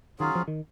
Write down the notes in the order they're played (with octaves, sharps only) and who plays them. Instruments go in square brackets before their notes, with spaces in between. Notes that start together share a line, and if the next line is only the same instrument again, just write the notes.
[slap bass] D#3 [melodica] F#3 C#4 F4 G#4
[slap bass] F3
D#3